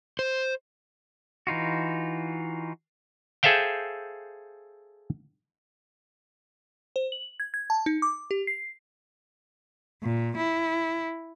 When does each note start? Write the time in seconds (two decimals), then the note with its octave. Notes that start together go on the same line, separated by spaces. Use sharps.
0.19 C5
1.47 E3 D#4 F4 F#4
3.43 G#4 A4 C5 E5 F5 G5
6.96 C5
7.12 F#7
7.40 G#6
7.54 G#6
7.70 A5
7.86 D#4
8.02 D6
8.31 G4
8.47 C7
10.03 A#2
10.38 E4